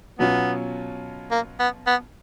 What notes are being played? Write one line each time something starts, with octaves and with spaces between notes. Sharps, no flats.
B2 F#3 B3 C#4 F4
A#3
B3
B3